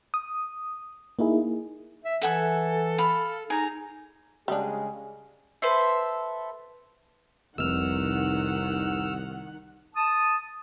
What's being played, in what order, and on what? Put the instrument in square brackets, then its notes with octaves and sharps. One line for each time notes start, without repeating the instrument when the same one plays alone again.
[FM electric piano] D#6
A#3 D#4 E4 G#4
[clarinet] E5
[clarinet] E3 [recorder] A4 [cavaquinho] E5 F#5 G#5
[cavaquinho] F5 B5
[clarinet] D#4 [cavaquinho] G#4 [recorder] A#5
[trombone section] C#3 G#3 G#4 [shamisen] G3 D4
[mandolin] A4 B4 C5 E5
[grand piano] F1 [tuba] C2 [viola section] D#3 F#5 [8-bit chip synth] E6 F6
[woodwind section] A5 D#6